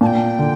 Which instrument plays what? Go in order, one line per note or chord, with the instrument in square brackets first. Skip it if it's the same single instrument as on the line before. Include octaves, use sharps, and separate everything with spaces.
[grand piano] A#2 [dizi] A5
[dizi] G5
[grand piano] D3